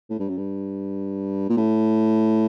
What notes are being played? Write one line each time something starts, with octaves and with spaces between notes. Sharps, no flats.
A2
G2
F#2
G2
A#2
A2